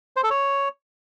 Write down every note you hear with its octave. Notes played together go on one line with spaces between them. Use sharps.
C5
A4
C#5